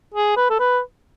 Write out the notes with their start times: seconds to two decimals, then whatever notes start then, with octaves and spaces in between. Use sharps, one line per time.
0.14 G#4
0.37 B4
0.50 A4
0.60 B4